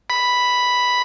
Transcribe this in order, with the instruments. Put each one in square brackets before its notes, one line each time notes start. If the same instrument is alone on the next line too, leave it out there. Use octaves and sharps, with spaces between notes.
[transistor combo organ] B5